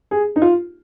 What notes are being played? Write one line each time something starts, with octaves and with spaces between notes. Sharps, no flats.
G#4
D#4
F4